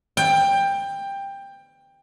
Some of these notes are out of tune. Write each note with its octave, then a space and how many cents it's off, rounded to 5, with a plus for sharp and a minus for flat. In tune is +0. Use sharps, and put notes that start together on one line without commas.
G5 +15